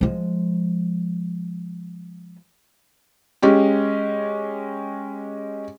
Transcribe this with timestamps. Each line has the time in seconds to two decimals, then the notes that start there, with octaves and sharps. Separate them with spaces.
0.01 F3 G#3
3.42 G#3 C#4 G4